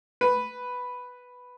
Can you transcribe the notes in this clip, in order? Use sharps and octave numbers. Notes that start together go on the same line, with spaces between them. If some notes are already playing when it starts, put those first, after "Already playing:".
B4